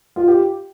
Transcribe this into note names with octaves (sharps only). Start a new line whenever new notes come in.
F4
G4